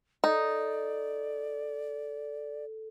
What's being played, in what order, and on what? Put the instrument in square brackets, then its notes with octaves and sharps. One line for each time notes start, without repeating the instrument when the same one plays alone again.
[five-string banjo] D#4 [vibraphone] A4 [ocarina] D5